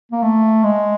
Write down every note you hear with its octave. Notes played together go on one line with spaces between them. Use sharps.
A#3
A3
G#3